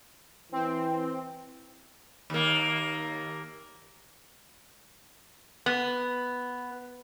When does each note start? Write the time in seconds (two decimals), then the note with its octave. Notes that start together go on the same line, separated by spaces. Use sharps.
0.52 E3 C4
2.30 D#2 A#3
5.66 B3